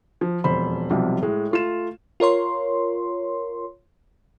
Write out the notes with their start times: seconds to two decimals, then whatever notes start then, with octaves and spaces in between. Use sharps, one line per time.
0.21 F3
0.44 E1 F2 C5 B5
0.90 B1 C3 F3 G3
1.21 A2 G#3
1.51 A3 F4 E7
2.20 F4 A#4 C#5 C6